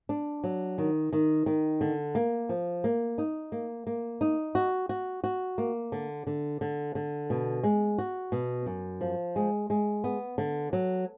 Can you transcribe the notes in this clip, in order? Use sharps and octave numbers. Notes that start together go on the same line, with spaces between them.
D4
F#3
D#3
D#3
D#3
D3
A#3
F3
A#3
D#4
A#3
A#3
D#4
F#4
F#4
F#4
A#3
D3
D3
D3
D3
B2
G#3
F#4
B2
F#2
F3
G#3
G#3
B3
D3
F#3